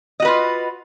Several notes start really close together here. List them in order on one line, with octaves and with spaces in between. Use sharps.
D#5 F#4 B4 F4